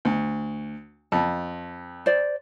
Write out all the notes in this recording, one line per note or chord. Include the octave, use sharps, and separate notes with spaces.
D2
F2 A5
C5 D5